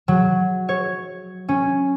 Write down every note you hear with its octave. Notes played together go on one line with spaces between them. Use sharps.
F#3
C#5
C#4